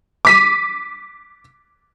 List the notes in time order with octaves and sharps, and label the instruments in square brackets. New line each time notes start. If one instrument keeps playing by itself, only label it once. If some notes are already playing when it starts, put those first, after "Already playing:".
[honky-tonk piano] D6 B6 D#7